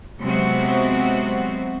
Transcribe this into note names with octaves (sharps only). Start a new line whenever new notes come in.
C3 F#3 G#3 B3 C4 F#4